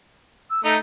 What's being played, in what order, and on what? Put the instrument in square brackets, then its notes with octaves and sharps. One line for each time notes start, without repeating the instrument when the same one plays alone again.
[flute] E6
[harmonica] A3 D#4 [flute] A#5